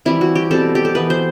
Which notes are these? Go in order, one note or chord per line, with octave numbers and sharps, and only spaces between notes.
E3 G3 C4 E4
F#4
G4
B2 G3 C4 A4
G4
A4
E3 B3 B4
C5